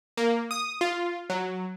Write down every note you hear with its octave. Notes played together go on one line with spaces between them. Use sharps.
A#3
D#6
F4
F#3